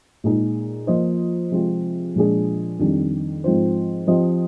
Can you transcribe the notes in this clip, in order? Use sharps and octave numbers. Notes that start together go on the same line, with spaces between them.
A#2 G#3 D#4 G#4
F3 A#3 F4 C5 D#5
C3 F3 G#3 C4 F4
A#2 F3 G#3 D4 G#4
F2 D#3 G3 D4
G#2 F3 C4 F4 C5
F3 C4 G4 C5 D#5